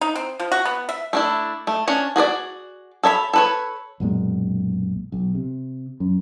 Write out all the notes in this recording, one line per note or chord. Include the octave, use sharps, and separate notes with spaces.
D#4
C4
F3
F#4
B3
E5
A3 D4 E4
A3
C#4 D4 C#5
F#4 G#4 B4 D5
A4 C#5 E5 B5
A4 B4 C#5
B1 F#2 A#2 G#3
B1
C3
F#2